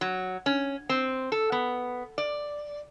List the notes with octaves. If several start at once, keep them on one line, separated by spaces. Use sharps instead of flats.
F#3
C#4
C4
A4
B3
D5